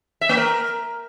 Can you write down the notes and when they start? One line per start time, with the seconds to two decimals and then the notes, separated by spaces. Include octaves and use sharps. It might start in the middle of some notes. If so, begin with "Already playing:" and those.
0.21 E5
0.29 A#3
0.37 A#4